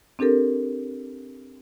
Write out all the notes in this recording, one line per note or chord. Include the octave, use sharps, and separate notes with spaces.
C4 D4 G4 A4 A#4